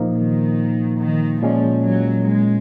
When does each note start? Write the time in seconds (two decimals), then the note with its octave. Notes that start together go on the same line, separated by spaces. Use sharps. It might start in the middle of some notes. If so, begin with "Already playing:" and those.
Already playing: A#2 F3 A#3 D#4
0.14 D#3
0.99 D#3
1.42 A#2 F3 G#3 C#4
1.85 F#3
2.28 G#3